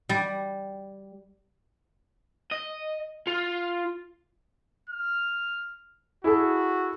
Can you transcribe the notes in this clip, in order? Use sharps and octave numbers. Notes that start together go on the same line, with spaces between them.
G3
D#5
F4
F6
E4 F#4 G#4 A4